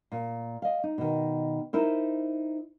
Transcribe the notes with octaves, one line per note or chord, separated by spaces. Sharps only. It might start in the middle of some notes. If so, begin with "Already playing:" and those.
A#2
D#5 F5
D#4
B2 D#3
D#4 E4 A#4 C5